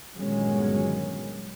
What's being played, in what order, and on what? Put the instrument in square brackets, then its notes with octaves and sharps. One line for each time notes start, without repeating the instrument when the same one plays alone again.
[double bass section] G1 A#2 D#3 F#3 G#3 C#4